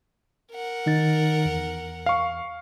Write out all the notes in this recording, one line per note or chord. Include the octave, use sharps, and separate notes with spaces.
A#4 F#5
D#3 D#4 A6
E2
F5 C#6